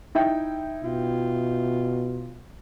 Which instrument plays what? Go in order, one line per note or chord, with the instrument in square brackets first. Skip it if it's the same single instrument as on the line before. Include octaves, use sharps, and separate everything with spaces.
[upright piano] D#4 E4 G5
[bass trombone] B2 [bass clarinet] F4